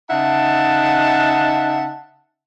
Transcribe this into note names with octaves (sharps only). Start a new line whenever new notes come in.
C#3 D#4 E5 F#5 A5